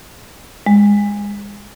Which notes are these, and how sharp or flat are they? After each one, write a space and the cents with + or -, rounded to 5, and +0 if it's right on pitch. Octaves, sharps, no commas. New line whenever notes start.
G#3 -20